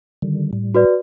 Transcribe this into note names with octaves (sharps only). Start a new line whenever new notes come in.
D3 D#3 G3
A2 G3
F#4 B4 D5